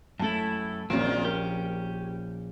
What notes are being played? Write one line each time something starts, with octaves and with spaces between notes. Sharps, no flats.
F#2 A2 A3 E4 A4 A5
A#1 F2 A#2 D#3 F#3 A#3 C4 C#4
C#4 G4 A#4